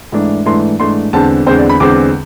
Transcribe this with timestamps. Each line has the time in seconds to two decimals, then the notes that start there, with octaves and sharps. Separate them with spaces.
0.12 G#2 E3 A3 D4
0.46 G#2 E3 A3 D4 C6
0.80 G#2 E3 A3 D4 C6
1.13 E2 D3 G#3 C4 A5
1.46 E2 D3 G#3 C4 C5
1.58 D5
1.70 B5
1.80 E2 D3 G#3 C4 D6